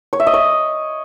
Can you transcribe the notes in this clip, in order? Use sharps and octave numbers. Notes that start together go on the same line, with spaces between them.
C#5
E5
D#5
C#5